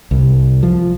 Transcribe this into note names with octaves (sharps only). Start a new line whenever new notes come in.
C2
F3